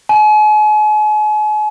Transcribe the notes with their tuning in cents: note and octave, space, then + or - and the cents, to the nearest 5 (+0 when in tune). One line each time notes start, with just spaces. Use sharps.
G#5 +40